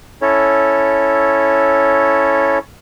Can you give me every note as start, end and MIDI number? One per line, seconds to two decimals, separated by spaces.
0.22 2.59 61
0.22 2.59 64
0.22 2.59 69
0.22 2.59 73